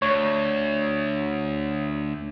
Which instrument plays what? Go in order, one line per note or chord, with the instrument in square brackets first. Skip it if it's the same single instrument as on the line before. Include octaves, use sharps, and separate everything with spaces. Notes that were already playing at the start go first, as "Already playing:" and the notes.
[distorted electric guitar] D2 [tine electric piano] C#5